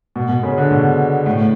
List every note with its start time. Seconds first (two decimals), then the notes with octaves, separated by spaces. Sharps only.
0.16 B2
0.29 B2
0.43 C#3
0.58 D3
0.71 B2
1.26 A2